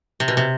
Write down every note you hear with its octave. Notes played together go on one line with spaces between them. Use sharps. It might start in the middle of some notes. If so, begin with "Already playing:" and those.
C3
B2
C3